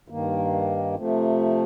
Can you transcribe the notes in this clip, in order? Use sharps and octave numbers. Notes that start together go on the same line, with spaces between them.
G2 D#3 A#3
C3 F3 A3